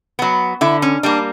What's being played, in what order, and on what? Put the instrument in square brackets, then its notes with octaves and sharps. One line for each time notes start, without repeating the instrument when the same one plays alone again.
[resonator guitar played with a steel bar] F#3 B3
D3 E4
C#4
G3 A#3 D4